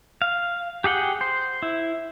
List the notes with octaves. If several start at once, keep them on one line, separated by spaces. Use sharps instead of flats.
F5
G4 G#4 F#5 G5
C5
E4